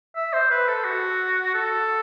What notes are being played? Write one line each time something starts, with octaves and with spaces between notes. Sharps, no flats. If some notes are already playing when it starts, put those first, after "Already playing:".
E5
C5
B4
A4
F#4
A4